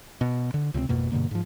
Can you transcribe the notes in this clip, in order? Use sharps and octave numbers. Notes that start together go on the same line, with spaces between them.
B2
D3
C#2 C3 E3 C4
G#1 F2 B2 A#3
G2 B2 D3 A#3
G#2 F3